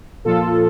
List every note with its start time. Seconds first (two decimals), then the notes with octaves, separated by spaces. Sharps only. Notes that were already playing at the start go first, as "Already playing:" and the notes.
0.25 A#2 F3 F4 A4